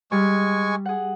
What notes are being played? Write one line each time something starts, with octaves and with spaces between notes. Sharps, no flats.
G3 G#3 G#5 C#6
G#4 F#5